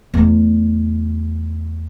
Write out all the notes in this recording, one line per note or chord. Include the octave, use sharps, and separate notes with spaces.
E2 A3